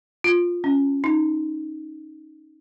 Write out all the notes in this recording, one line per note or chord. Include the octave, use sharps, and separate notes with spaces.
F4
C#4
D#4